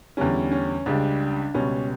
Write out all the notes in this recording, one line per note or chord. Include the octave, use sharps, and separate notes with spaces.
E2 D3 G3 C#4
C#4
C#2 C#3 G3 D4
C#2 B2 G3 C#4